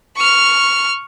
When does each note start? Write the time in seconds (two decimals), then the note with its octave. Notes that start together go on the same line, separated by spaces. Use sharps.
0.17 C#6 F6